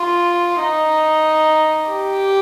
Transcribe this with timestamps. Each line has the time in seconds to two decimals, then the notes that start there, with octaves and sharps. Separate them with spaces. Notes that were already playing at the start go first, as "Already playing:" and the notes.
Already playing: F4
0.62 D#4
1.90 G4